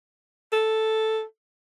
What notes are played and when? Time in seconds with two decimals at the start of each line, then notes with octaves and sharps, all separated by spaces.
0.53 A4